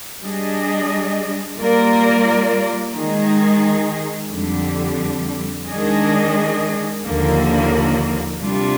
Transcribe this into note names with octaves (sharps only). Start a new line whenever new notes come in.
G3 D4 G#4 D#5
G3 A#3 F4 A#4 D5
D#3 G#3 D#4 G#4
F2 D3 G3
D#3 G#3 D4 G#4 D#5
D#2 D3 F3 A#3
C3 G3 D4 F4